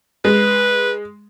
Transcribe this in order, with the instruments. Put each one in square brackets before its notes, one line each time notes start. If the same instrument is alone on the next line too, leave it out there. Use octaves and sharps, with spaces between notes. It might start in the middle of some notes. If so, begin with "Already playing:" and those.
[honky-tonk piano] G#3 [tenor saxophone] B4